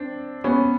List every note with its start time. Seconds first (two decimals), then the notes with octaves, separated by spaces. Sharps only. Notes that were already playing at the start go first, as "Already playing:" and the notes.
Already playing: C4 D4
0.44 B3 C#4